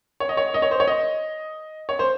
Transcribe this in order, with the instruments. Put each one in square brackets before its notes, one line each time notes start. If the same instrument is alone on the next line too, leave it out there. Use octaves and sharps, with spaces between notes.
[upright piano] C#5
D#5
C#5
D#5
C#5
C5
C#5
D#5
C#5
C5